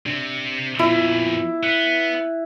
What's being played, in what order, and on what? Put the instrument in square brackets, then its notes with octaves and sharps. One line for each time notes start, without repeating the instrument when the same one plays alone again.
[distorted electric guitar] C3 [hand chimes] D4
[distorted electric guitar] F2 A#2 [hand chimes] B3 F4 D7 [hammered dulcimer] E4
[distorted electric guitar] B3 [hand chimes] F#6